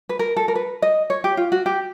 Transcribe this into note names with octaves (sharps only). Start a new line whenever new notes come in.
B4
A#4
A4
A#4
B4
D#5
C#5
G4
F4
F#4
G4